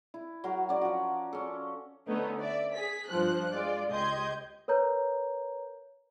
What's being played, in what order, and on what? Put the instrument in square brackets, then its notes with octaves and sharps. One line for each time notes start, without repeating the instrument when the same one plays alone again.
[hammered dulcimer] E4
F#3 F#4 A#4
C#4 D5
F3 F#4
C#4 A4
[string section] D3 A3 B3 C#4 D#4
D5 E5
G#4 B6
G2 F3 C5 F#6
G#3 F4 D5
C#2 G4 D#5 C6 G6 G#6
[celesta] A#4 B4 C#5 A#5 G6